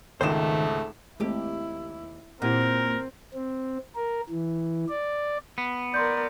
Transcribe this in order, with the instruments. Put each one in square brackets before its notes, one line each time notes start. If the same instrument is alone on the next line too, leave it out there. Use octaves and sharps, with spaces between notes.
[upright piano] G#1 C#2 E7 [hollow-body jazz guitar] D#3 C5 [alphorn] A3
[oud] D#2 G4 [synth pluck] G#3 A3 C4 [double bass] E4
[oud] A#2 [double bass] C4 [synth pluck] E4 G4 F#5 [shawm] A#4
[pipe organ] C4
A#4
E3
D5
[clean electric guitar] B3
[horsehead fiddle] A#4 D5 [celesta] C6 G6